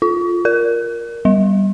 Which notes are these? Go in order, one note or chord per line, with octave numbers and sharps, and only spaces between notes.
F4
A#4
G3